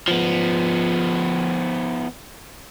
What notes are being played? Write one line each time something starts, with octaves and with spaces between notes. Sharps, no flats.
F3 B3